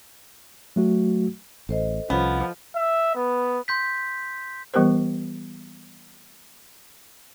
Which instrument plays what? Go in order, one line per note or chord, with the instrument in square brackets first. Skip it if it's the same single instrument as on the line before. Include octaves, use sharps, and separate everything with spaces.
[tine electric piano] F#3 A3 F#4
[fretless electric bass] A1 [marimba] A4 C5 D#5
[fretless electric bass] C2 C#4 [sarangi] F3 [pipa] B3
[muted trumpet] E5
B3
[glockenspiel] C6 G6 B6
[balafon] E3 G3 B3 G4 A#4 C5